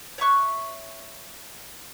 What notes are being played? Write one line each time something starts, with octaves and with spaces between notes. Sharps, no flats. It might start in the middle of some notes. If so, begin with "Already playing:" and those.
C#5 E5 C#6 F#6